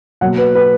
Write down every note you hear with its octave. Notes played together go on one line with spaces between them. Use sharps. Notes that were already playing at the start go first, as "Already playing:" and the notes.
B2 F#3 A#3 F#5
B4
B4